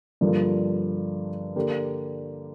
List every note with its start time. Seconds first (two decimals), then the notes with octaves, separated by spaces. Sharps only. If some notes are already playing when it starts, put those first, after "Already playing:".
0.21 G2 D3 F3 A#3
1.56 D3 A#3 G4